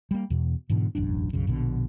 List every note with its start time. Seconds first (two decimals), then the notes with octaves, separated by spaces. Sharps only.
0.11 G3 A#3
0.30 E2 B2
0.70 G#2 B2 D3 E3
0.95 E1 A1 F#2 D4
1.33 B1 F#2 C#3
1.47 A#1 B2 D3